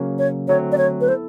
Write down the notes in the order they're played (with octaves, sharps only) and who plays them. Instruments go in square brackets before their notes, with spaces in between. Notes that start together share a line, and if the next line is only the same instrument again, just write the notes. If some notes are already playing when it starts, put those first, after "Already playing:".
Already playing: [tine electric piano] C#3 F#3 A#3 C#4
[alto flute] C#5
[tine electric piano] D3 F#3 A3 C4 [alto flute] C#5
[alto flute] D5
C#5
B4
[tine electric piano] B3 E4 A4 [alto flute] C5